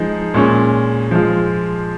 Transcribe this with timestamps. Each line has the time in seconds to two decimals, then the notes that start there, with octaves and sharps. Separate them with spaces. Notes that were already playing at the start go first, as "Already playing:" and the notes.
Already playing: F3 G#3 D#4
0.34 A#2 G#3 C#4
1.11 F3 G#3 F4